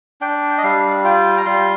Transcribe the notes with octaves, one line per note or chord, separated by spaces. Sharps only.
D4 G5
D#5
G3 F5
F4 G5
A#5
G3 C6